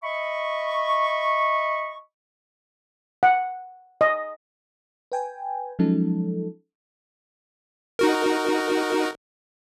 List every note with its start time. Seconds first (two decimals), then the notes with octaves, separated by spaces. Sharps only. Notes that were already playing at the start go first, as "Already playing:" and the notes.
0.03 D#5 E5 B5 C#6
3.23 F#5
4.01 D#5
5.12 B4 G5 G#5
5.79 F3 F#3 G#3 C#4 D#4 A4
7.99 D#4 F#4 A#4